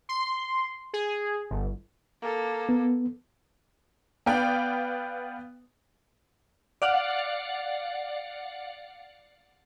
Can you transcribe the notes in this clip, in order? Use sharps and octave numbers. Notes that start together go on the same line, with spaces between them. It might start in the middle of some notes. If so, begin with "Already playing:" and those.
C6
G#4
G1
A#3 A4
B3
B3 B4 D5 F5 G5
D5 F5 F#5